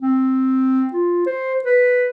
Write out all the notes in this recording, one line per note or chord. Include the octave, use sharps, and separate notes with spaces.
C4
F4
C5
B4